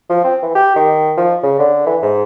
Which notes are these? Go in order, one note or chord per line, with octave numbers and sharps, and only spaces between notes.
F3
C4
E3
G4
D#3
F3
C#3
D3
E3
G#2